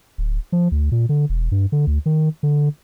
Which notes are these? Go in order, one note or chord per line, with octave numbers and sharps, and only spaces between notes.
D1
F3
D2
A#2
D3
E1
G2
D3
D2
D#3
D3